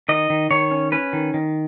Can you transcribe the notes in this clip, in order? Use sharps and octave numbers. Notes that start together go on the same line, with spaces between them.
D#3 D#5
D#3
D#3 C#5
C#4
C#4 B4
D#3
D#3